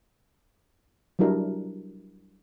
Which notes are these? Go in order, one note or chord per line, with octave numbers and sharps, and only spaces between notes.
F#3 G3 D4 E4 A#4